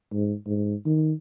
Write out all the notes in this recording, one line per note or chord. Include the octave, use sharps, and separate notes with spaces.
G#2
G#2
D#3